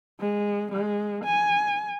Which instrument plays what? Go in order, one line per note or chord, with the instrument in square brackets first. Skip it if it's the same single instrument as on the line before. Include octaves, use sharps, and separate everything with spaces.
[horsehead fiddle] G#3
G#3
G#5